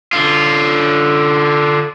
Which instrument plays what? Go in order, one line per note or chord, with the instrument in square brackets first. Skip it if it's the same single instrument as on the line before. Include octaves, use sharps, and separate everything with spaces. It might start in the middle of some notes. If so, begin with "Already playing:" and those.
[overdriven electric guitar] D3 F4